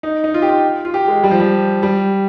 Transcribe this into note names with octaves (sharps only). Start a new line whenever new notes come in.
D#4
D#4
F4
G4
F4
F4
G4
G#3
G3
F3
G3
G3